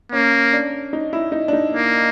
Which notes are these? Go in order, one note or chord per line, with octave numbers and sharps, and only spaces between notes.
A#3 C#4
D4
D#4
E4
D#4
D4
D#4
A#3